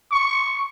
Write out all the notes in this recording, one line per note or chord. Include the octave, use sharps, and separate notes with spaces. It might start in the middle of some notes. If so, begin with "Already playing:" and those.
C#6